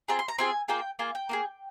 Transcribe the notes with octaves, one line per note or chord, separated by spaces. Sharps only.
C4 F4 G#4 A#5
C6
A#5
C4 F4 G#4 G#5
A#3 F4 G#4 G5
A#3 F4 G#4 G#5
G5
A#3 F4 G#4